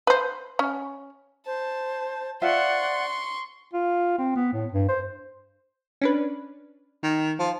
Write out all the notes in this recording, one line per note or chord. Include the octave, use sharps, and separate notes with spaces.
B4 C5
C#4
C5 A5
F4 C5 D5 E5 F#5 C6 C#6
F4
C4
B3
A2
G2
C5
C#4 D4 B4
D#3
F3